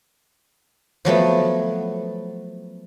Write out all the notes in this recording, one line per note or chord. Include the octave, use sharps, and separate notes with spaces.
F3 F#3 A3 B3